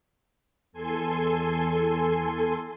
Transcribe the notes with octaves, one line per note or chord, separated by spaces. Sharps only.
E2 A4 G#5 C6